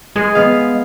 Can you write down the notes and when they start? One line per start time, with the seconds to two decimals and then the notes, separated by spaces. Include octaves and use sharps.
0.16 G#3 G#4
0.35 B3 F5